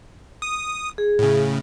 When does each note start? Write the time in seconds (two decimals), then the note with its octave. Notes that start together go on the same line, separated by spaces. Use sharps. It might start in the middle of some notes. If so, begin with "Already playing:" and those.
0.42 D#6
0.98 G#4
1.19 A2 C#3